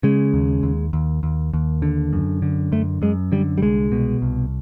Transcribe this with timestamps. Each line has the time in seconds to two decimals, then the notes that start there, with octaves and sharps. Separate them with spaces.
0.03 C#3 G#3
0.34 D#2
0.63 D#2
0.93 D#2
1.23 D#2
1.54 D#2
1.82 D3
2.13 F#2
2.42 D3
2.72 F#2 A3
3.02 F#2 G#3
3.32 D3 G3
3.58 G3
3.62 C2 G#3
3.92 B2
4.22 C2